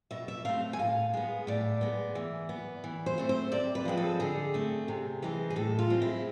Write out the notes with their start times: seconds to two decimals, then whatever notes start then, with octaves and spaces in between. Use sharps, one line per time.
0.11 B2 E5
0.28 E5
0.45 A3 C4 F5
0.73 G#5
0.79 A2 F5
1.14 G#3 B3
1.47 A2 D5
1.81 G#3 B3
2.15 E3
2.49 B3
2.84 E3
3.06 C5
3.18 A3 C4
3.29 C5
3.52 C3 D5
3.75 B4
3.85 F3 G#3 C4
3.97 A4
4.20 D3 G#4
4.54 A3 C4
4.88 C3
5.22 E3 G#3 C4
5.50 G#4
5.56 A2 A4
5.79 F4
5.90 G#3 C4
6.02 E4